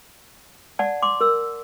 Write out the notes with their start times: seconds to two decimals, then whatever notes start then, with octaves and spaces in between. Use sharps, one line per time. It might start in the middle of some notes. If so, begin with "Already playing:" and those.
0.79 D5 F#5 A5
1.02 C6 D6
1.21 A#4 E6